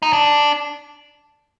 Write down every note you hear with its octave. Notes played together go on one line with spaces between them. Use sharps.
D#4
D4